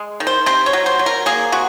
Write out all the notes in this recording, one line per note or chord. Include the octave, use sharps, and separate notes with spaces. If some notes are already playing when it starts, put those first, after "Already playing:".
Already playing: G#3
D#3
C5
C3 C5
C#5
F#3
C5
F#3
A#4
A#3 G#4
C3 F#4